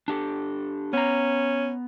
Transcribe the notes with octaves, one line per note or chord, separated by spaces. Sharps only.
D4 G4 A4
B3 C#4 A#5